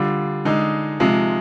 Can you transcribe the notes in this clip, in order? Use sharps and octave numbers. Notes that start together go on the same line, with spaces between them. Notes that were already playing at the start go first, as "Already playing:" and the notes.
Already playing: D3 G3 F4
D3 G#3 D#4
C3 F3 G#3